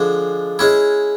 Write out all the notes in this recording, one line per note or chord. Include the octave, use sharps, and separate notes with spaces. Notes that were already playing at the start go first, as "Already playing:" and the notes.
Already playing: D3 F3 G#3
G#3 C#4 E4